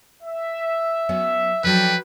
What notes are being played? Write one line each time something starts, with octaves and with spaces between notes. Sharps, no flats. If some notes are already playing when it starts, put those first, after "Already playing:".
E5
F#3 B3 C#4
F3 F#3 D4 A4 B4 G5